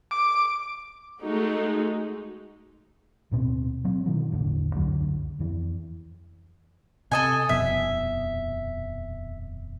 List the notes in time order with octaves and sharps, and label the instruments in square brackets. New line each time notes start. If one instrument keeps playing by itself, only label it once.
[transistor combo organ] D6
[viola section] G#3 A3 D#4 F#4
[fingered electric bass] D1 B2 C4
F#3 C4
B2 D#3 E3 F#3
A1 E2 D3
C#2 F#2 D3 F#3
F2 E3
[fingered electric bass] C3 [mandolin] A4 D#5 G#5
[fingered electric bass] D#1 F2 B2 [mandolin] E5